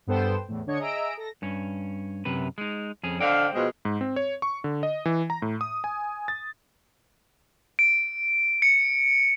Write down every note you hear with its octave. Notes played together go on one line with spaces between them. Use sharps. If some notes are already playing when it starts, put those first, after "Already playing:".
G2 B3 A4 C5 G5 E7
E2 A2
D3 D4 C#5 D#5 G#6 C#7
G#4 D#5 E5 A#5 E6 D7
A4 A#6
G2 C#4
F#2 C3 B4
G#3 D#4
F2 C#4 G#4
D3 C5 D#5 F5 G5
B2 F3 G#3
G#2
C4
C#5
C#6
D3
D#5
E3
A#5
A2
D#6
G#5
A6
D7
C#7